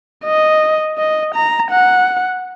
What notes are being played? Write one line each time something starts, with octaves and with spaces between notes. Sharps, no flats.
D#5
D#5
A#5
F#5